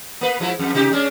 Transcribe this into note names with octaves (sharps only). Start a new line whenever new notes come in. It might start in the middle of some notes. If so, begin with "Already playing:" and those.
A#3 B4
F3 G#3 E4
F2
C3 D#4 G4
G#3 C#4 D4